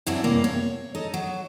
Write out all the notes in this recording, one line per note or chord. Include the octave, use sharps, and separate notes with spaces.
F#2 C3 F#3 D4 E4 F#4
G2 C3 A#3
C#5
D#4 A4 D#5
F#3